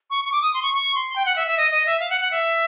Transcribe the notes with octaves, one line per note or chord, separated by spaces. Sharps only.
C#6
C#6
D6
D#6
C6
C#6
C#6
C6
G5
F#5
E5
E5
D#5
D#5
E5
F5
F#5
F#5
E5